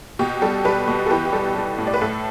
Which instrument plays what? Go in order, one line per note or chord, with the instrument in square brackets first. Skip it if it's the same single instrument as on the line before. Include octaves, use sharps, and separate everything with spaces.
[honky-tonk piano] B2 G4
G3 A4
G3 G4 B4
B2
A4
E3 G4 B4
G4
G3 A4
G3
A2
D5
B4
A2 A4